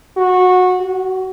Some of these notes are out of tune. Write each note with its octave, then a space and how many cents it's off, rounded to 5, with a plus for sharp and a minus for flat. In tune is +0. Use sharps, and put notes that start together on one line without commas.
F#4 -20
F#4 +25